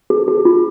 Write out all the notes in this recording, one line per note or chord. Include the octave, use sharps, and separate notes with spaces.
G#4
G#4
F4